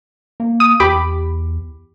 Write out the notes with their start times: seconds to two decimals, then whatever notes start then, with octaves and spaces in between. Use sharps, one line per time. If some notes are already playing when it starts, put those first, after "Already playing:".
0.40 A#3
0.60 D#6
0.80 E2 G4 B5 D6